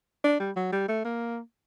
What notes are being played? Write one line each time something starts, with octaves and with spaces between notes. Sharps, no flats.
D4
G3
F#3
G3
A3
A#3